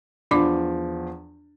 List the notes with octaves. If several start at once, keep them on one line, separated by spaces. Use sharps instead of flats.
E2 F3 D4 D5 D6